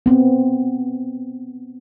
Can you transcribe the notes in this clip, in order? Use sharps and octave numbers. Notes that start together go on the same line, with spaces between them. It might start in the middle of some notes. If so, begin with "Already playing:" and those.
B3 C4